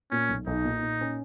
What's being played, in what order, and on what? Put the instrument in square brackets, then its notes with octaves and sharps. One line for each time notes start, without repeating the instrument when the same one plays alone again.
[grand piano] A#2 [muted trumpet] C#4
[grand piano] B1
[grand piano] B1 [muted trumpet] D#4
[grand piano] A#2
A#2
C#4